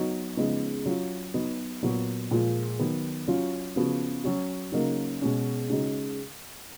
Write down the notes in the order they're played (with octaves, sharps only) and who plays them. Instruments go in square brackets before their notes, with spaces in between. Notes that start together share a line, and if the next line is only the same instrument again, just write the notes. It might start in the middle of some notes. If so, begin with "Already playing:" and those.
Already playing: [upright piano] F#3 B3 D#4 F#4
C#3 F3 G#3 B3 D#4
F#3 C#4 F4
F#3 B3 D#4 F#4
A#2 F#3 B3 F#4
A#2 F3 G#3
D#3 F#3 B3
F#3 C#4 F4
C#3 F3 B3 F#4
F#3 C#4 F#4
C#3 F#3 A#3 D#4
B2 G#3 C#4
C#3 G#3 D#4 F#4